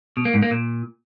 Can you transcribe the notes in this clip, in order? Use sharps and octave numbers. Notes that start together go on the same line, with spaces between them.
B2
A#3
G#2
A#3
A#2